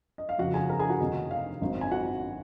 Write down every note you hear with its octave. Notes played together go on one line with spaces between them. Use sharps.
D#5
F5
F2 C#3 F3 F#4 F#5
G#4 G#5
A#4 A#5
G#4 G#5
F#4 F#5
F1 D#2 D#3 F#3 D#5
F5
G#1 F#2 D#3 F#3
G#5
F#4 F#5